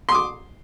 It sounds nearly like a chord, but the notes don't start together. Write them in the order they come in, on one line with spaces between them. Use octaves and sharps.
C6 D#6 D6